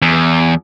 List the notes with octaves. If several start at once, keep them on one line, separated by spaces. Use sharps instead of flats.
E2